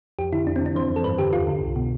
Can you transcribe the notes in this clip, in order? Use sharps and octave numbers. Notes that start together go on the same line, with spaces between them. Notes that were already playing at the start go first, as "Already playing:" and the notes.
F2 G4
D3 E4
F2 D4
C4
D3 D4
E3 C5
F2
A4
G2 B4
D3 G4
E2 F4
D3
C2
B2